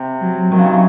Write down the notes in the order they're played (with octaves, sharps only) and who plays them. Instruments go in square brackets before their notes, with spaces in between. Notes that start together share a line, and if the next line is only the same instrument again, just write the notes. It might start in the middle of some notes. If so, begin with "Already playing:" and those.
Already playing: [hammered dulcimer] C3
[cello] F#3
[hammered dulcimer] D#3 [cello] F#3
[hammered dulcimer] C#3
C3
C#3